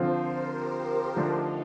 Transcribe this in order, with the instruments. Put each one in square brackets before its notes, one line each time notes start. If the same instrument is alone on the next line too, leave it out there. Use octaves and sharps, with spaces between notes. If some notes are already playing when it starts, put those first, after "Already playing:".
Already playing: [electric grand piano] D3 F3 C4 F4 [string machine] C5
[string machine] A#4
G4
[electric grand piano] D3 F3 A3 D4 [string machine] D#4